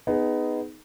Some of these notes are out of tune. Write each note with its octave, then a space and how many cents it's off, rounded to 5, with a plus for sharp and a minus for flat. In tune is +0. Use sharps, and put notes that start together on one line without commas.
B3 +20 D#4 +0 G#4 +0